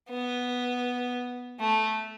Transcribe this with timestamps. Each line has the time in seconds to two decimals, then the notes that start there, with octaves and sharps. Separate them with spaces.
0.10 B3
1.59 A3